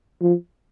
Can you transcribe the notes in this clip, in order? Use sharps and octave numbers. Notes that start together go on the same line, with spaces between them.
F3